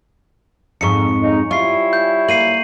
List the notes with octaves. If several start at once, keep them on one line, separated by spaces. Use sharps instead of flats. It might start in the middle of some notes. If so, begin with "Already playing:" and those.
F2 G#2 C#6 C#7
C#3 D#4
G3 C#4 E4 F4 C#6 C7
G6
A#3 C7 D#7 F#7